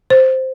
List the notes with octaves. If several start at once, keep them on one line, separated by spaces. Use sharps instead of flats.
C5